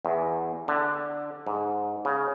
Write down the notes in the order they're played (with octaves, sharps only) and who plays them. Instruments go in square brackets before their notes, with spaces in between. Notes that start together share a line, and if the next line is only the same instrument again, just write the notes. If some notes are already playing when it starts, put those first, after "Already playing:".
[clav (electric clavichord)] E2
D3
G#2
C#3